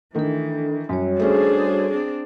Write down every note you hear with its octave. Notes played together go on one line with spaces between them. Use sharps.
D#3 E3 A3 D4 A4
F#2 G3 F#4 C#5
A3 C#4 D4 G#4 C5
C4 D4